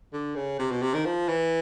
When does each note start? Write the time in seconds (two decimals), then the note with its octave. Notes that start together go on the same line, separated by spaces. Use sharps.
0.13 D3
0.36 C#3
0.59 C3
0.71 B2
0.82 C3
0.94 D#3
1.05 F3
1.28 E3